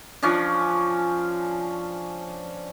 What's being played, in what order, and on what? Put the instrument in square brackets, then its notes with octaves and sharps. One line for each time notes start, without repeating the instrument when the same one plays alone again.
[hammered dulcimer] F3 C#4 D4